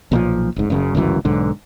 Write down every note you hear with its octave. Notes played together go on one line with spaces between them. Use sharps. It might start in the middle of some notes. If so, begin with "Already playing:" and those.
B1 A#2 E3 F3
F1 G#2
F#1 F#2 C#3
G1 C#2 F#2 E3
B1 G#2 D3